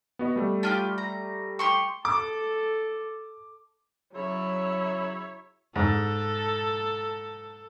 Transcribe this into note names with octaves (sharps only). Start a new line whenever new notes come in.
B3 F#4 D#5
G3 A3
D4 F4 G4
A#5
G4 C6 C#6
A4 D6
C#3 F#3 E4 C#5 E5
G#2 A4